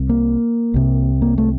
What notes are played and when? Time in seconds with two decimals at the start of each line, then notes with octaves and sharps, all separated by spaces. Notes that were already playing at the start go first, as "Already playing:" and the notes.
Already playing: C2 C3
0.09 A#3
0.74 C2 C3
1.22 A#3
1.38 A3